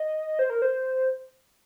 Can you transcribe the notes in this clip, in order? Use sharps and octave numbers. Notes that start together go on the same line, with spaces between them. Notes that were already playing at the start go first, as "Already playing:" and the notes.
Already playing: D#5
C5
A#4
C5